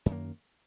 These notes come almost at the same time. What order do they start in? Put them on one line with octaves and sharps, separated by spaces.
F#2 D#3 A#3